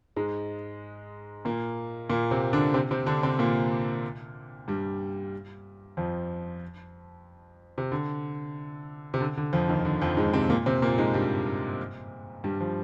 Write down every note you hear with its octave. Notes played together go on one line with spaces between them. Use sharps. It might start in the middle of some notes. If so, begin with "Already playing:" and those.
G#2 G#3
A#2 A#3
A#2 A#3
C3 C4
D3 D4
C3 C4
C3 C4
D3 D4
C3 C4
A#2 A#3
G2 G3
F2 F3
C3
D3
C3
D3
D3
F2 F3
D#2 D#3
D3
F2 F3
G#2 G#3
C3 C4
A#2 A#3
C3 C4
A#2 A#3
G#2 G#3
G2 G3
G2 G3
F3